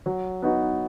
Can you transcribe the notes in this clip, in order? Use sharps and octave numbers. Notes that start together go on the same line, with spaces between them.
F#3
B3 D#4 F#4